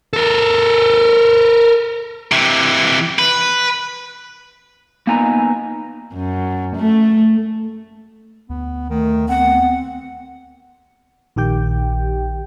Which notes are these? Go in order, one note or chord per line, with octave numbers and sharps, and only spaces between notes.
A4 A#4
C3 E3
B4
A#3 B3 D#4 G#5 A#5
F#2
A3
D2 B3
D#3 A3
B3 C4 F#5
A#1 D#3 G4 G5